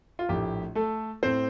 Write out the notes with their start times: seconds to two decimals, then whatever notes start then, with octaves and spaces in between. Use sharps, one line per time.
0.19 F4
0.29 A#1 A2 A3 G4
0.75 A3 A4
1.22 A2 A3 C4 C5